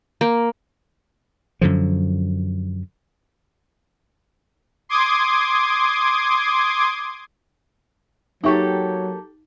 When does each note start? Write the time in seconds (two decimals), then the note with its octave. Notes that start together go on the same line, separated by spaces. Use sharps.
0.21 A#3
1.61 F#2 D3 F3
4.89 C6 D6 D#6 G#6
8.44 F#3 A#3 D#4 G4 A4 E5 C#6